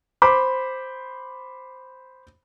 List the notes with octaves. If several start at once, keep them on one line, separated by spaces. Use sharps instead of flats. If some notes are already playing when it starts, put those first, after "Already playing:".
C5 B5 D6